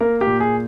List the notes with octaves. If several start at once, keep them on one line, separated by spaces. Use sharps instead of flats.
A#3 A#4
G4
A#2
G#4